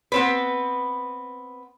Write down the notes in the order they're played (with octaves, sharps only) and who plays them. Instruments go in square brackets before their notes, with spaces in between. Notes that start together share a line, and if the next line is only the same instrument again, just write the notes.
[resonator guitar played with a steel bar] B3 C4 B4